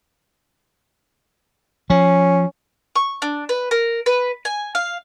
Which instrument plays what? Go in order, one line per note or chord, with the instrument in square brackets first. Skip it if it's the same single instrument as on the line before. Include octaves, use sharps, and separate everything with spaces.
[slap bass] F3 [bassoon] C#4
[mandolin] C#6
D4
B4
A#4
B4
G#5
F5